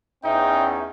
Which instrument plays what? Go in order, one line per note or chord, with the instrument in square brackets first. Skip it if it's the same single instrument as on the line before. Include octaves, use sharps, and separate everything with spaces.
[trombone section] E2 C#4 [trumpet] D#4 [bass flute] E5 [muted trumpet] G5